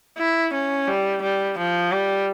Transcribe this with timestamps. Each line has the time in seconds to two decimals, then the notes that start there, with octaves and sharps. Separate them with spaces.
0.18 E4
0.53 C#4
0.88 G3
1.22 G3
1.58 F3
1.92 G3